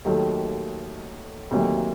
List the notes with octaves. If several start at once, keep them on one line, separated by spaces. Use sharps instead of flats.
D#2 D#3 F#3 A3
D2 C3 D#3 F#3 A#3